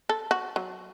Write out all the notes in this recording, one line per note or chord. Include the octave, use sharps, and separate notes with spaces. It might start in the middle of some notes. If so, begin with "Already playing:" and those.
A4
F#4
F#3